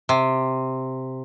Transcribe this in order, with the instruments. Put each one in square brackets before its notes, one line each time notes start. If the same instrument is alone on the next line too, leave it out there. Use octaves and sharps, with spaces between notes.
[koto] C3